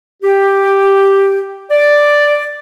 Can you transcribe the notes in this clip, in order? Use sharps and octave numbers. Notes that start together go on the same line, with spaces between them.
G4
D5